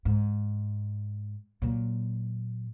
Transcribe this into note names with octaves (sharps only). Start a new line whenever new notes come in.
G#2
A#2 F#3